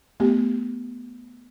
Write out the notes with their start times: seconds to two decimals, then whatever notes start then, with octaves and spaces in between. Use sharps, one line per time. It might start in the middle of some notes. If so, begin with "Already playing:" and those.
0.20 A3 B3 G4